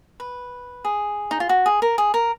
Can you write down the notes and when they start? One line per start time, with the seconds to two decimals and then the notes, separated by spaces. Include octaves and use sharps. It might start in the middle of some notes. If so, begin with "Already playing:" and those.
0.20 B4
0.85 G#4
1.31 D#4
1.40 F4
1.49 F#4
1.66 G#4
1.82 A#4
1.98 G#4
2.14 A#4